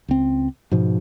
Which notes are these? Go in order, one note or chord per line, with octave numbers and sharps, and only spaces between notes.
C#2 C4
G#2 B2 F3